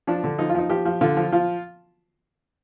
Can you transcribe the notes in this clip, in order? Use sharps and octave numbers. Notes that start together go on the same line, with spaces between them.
F3 D4
D3
F3 D#4
F4
F3 D#4
F3 G4
F3
D3 F4
F3
F3 F4